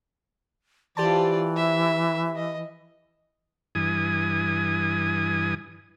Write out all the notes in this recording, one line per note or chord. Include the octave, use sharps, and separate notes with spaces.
E3 F4 G4 C5 D5 A5
E5
D#5
G2 E3 G#5 D#6